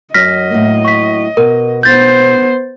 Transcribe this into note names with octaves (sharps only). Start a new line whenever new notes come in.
F#2 F#3 C#4 D#5 F6 A#6 B6
A2 F#3 A#3
C#6 B6
B2 A#4
B3 C5 G6 A6